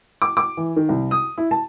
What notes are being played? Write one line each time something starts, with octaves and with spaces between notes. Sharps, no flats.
D6
D6
E3
D#3
C2
D#6
E4
A5